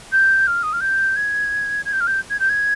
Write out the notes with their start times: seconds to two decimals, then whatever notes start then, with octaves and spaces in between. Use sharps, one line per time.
0.12 G6
0.47 F6
0.63 D#6
0.73 F6
0.81 G6
1.16 G#6
1.85 G#6
1.93 G6
2.00 F6
2.07 G6
2.30 G#6
2.40 G6
2.49 G#6